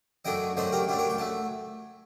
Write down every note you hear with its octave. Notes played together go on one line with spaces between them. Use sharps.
F#2 F#3 A3 D4 D#5 G5
F#2 F#3 A3 D4 C5 D#5
G4 A#4
F#2 F#3 A3 D4 G4
G4 A#4
G5
F#3 A3 A5